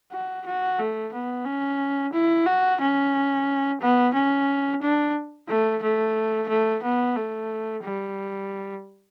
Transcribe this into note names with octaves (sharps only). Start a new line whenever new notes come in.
F#4
F#4
A3
B3
C#4
E4
F#4
C#4
B3
C#4
D4
A3
A3
A3
B3
A3
G3